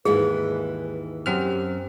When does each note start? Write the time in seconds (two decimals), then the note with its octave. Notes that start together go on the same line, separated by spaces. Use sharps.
0.05 D#2 G#2 E3 G#4 B4
1.26 F#2 C4 G4 F6